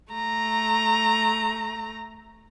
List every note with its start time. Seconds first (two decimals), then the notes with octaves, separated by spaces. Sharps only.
0.12 A3 A#5